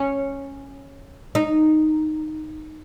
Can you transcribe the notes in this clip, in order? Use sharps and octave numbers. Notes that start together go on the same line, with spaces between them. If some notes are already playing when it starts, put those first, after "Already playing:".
Already playing: C#4
D#4